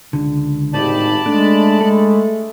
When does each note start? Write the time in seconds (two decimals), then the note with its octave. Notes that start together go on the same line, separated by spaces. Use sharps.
0.13 C#2 D3
0.74 G#1 A2 D#4 G4 D5 A5 B5
1.26 G#3 A3 D4
1.81 G#3 A4